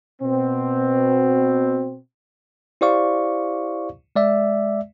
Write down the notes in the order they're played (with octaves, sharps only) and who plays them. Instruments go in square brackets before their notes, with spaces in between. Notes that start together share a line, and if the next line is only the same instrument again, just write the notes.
[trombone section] B2 C4
[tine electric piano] E4 G4 C5 D5 F5 C#6
G#3 D5 E5